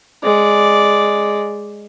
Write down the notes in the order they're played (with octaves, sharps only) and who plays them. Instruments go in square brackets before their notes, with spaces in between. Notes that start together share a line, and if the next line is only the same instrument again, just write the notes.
[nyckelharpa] G#3 D5